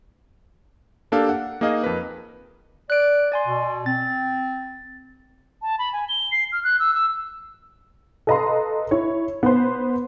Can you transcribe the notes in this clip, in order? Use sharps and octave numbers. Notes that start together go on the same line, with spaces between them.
A#3 D4 G4 A4 F5
F#5
A#3 D#4 G#4 D#5 F5
F2 A#4 B4
D5 F#6 D7
D5 G#5 C6
B2
C4 A6
A5
B5
G#5
G7
C7
F6
F#6
E6
E6
A4 B4 D#5 F5 A#5 C6
E4 C#5
B3 B4 C5